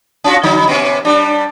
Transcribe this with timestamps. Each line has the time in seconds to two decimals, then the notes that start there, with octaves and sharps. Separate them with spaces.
0.24 C#4 F4 F#4
0.43 D3 F#3 D#4
0.67 C3 B3 C#4
1.05 G3 D4